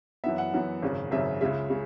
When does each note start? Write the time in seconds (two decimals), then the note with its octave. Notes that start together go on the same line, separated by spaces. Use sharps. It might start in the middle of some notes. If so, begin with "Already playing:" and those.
0.24 F#2 E3 B3 E5
0.38 F#5
0.53 F#2 E3 B3
0.82 G#1 F#2 C#3
1.11 G#1 F#2 C#3 E5
1.41 C#2 C#3 G#3 E5
1.70 C#3 G#3